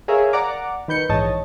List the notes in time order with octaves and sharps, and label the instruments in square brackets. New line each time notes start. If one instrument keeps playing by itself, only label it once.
[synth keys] G#4 A#4 C#5 E5 F5
D5 F#5 A#5 D6
D#3 B4 G6 C#7
A#1 G#2 E3 C#5 D#5 A5